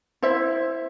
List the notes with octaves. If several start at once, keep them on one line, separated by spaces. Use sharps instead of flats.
E4 C5 E5